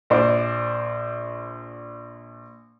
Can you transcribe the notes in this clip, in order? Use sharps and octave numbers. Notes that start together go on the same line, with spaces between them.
A#1 C5 D5